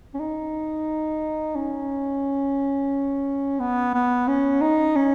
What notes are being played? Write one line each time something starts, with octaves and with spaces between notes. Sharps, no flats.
C#4
D#4
C#4
B3
B3
C#4
D#4
C#4